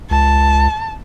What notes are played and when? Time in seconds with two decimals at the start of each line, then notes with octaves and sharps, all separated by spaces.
0.11 C#2 A5